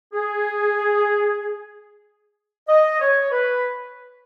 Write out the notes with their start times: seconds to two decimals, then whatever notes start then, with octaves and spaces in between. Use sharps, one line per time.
0.13 G#4
2.68 D#5
3.00 C#5
3.31 B4